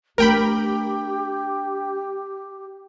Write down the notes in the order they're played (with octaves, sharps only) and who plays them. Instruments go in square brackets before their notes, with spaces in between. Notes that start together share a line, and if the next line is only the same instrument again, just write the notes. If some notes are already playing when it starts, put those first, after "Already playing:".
[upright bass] A3 D4 [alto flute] G4 [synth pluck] A#4 G5 B5